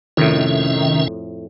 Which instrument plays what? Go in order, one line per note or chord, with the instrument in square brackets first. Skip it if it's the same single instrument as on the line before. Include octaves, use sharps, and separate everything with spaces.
[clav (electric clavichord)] F2 A2 [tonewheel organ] C3 C#4 E5 [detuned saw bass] D#3